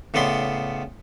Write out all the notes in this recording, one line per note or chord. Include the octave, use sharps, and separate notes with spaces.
A2 C#3 B3 D5 B5 C6